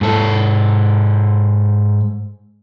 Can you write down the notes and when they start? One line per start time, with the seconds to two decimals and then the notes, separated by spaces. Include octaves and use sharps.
0.01 G#2 A4